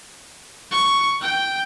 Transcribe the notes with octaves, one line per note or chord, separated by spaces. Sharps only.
C#6
G5